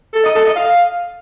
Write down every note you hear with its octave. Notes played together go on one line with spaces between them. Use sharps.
A4
D#5
A4
D#5
F5